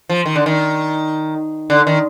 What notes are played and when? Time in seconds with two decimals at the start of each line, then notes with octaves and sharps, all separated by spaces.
0.09 F3
0.26 D#3
0.36 D3
0.46 D#3
1.70 D3
1.87 D#3